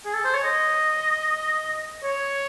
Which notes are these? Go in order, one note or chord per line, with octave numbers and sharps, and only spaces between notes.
G#4
A4
C5
C#5
D#5
C#5